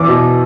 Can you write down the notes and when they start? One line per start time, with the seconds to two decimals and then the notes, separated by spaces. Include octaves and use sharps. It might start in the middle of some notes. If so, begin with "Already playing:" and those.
Already playing: E2 D6
0.08 B2